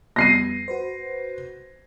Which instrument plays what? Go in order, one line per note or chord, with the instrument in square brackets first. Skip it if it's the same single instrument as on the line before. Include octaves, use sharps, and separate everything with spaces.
[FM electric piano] F2 G3 B3 [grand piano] A#6 C7 D#7
[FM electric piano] F#4 B4 C5